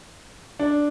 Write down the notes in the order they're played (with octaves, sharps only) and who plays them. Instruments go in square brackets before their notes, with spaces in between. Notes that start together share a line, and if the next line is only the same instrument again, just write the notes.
[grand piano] D4